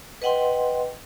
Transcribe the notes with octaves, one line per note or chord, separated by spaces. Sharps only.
B4 D#5 F#5 G5 C6